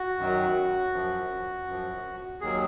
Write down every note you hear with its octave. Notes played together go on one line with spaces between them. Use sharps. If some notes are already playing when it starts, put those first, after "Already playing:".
Already playing: F#4
F#2 D#3 F#3
F#2 F3
F#2 F3
D#2 D#3 F#3 G#4